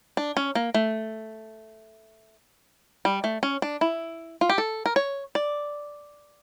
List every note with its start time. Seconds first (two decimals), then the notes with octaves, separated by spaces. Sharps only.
0.17 D4
0.37 C#4
0.55 A#3
0.74 A3
3.05 G3
3.24 A3
3.43 C#4
3.62 D4
3.81 E4
4.41 F4
4.50 G4
4.58 A4
4.86 A#4
4.96 C#5
5.35 D5